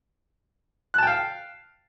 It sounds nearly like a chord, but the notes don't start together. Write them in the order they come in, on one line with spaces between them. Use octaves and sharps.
F#6 A5 G5 F5